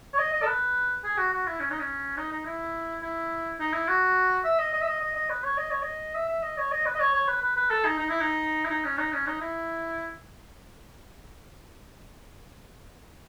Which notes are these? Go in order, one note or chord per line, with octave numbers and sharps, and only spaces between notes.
C#5
D#5
D#5
A4
B4
G#4
F#4
F#4
E4
C#4
D#4
C#4
D#4
D#4
E4
E4
D#4
E4
F#4
E5
D#5
D#5
E5
D#5
D#5
D#5
B4
C#5
D#5
C#5
D#5
E5
E5
D#5
C#5
D#5
B4
D#5
C#5
C#5
B4
B4
B4
A4
D#4
D#4
E4
D#4
E4
D#4
C#4
D#4
C#4
D#4
E4